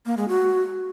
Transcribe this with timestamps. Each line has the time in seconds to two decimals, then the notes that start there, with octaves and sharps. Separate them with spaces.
0.06 A#3
0.17 G#3
0.28 F#4